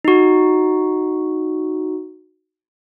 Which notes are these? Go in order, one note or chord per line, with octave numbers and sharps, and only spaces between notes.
D#4 F#4